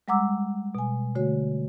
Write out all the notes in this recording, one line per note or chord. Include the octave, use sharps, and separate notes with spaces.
G3 G#3 F#5 A#5 D6 E6
B2 G#5
D3 A3 F#4 C#5